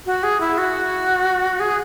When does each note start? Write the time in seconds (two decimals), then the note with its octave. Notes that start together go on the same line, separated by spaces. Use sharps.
0.06 F#4
0.23 G#4
0.41 E4
0.58 F#4
1.60 G#4